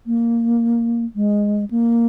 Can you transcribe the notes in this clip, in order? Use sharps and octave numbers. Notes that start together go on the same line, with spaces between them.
A#3
G#3
A#3